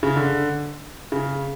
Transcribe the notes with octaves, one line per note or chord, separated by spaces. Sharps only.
C#3
D3
C#3